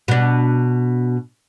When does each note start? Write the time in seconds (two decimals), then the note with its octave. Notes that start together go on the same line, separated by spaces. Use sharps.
0.08 B2 D4